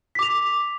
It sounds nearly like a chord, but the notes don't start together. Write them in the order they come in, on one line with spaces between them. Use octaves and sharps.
B6 D6 F7